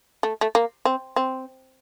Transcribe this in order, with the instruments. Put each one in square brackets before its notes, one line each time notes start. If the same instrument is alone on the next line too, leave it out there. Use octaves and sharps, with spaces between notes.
[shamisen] A3
A3
A#3
C4
C4